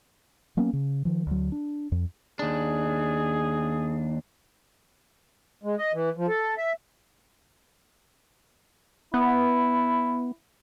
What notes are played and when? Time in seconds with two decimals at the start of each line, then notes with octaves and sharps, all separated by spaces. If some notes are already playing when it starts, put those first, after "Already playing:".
0.57 F#3 A#3 B3 C#4
0.73 C#3
1.05 D#3 F3
1.27 D2 F#3
1.52 D4
1.92 F2
2.39 D#2 D4 G#4
5.63 G#3
5.78 D#5
5.94 E3
6.17 F3
6.28 A4
6.58 E5
9.14 B3 E4